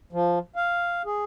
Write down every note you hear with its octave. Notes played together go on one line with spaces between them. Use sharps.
F3
F5
G#4